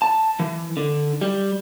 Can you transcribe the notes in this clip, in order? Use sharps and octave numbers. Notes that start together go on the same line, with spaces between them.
A5
E3
D3
G3